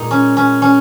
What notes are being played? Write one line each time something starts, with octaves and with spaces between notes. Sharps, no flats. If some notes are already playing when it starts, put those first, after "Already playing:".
Already playing: A#2 G#3 D#4
C#4
C#4
C#4